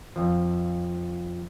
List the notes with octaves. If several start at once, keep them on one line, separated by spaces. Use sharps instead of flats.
F2 F3